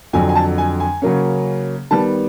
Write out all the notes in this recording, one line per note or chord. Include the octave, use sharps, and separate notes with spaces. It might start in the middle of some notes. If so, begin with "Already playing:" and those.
F2 D3 F#3 G#5
G#5
A5
G#5
G#5
C#3 F#3 A#3 C#4
D#3 G3 B3 A5